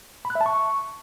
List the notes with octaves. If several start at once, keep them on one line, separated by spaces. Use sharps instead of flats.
B5
F#6
E5
A5
C#6